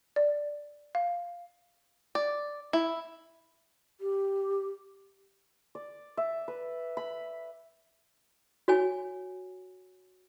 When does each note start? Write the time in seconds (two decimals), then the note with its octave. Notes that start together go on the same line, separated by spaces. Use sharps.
0.16 D5
0.95 F5
2.15 D5
2.73 E4
4.01 G4
5.75 D5
6.17 E5
6.48 B4
6.97 B5
8.68 F#4 C#5 G#5